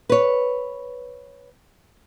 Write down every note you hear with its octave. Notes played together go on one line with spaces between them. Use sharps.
B4 C#5